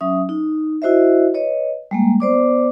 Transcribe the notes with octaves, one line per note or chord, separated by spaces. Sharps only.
F#3 C#4 E5 D#6
D#4
E4 F#4 C5 D#5 E5
B4 C#5 D#5
G3 G#3 A#3
B3 C5 D5 D6